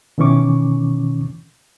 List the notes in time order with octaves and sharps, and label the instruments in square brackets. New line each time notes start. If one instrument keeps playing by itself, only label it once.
[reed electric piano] B2 D#3 E3 C#4 C#6 D6